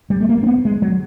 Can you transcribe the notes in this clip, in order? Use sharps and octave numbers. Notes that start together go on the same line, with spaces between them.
G3
A3
A#3
C4
B3
G#3
F#3